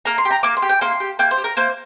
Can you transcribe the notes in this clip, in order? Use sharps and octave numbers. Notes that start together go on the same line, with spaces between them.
A#3 A#5
C6
G4
A#5
A#3 D6
C6
G4
G5
A#3 C6
G4
A#3 G5
C5
G4
A#4
A#3 C5